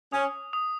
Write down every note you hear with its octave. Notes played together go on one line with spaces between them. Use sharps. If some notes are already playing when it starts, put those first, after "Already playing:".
C#4 D#6
D#6